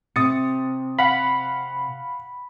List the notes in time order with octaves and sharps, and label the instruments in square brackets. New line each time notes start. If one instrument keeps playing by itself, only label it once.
[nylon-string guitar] C3 [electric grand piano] D#6 A6 C#7
[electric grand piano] F5 F#5 [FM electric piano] B5